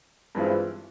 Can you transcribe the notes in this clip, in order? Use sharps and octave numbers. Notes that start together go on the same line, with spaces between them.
G2 E3 G#3 C4 F4